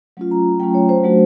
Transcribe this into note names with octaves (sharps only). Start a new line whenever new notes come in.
F#3 A3 C#4 F4
A#5
F#3 A3 C#4 F4 G5
C#5
C5
F#3 A3 D4 F#4